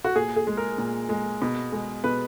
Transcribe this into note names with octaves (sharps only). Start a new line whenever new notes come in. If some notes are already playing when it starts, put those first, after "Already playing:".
F#4
A#2 G#4
G#4
G#3
A#4
A#2
G#3
B2
G#3
B2 B4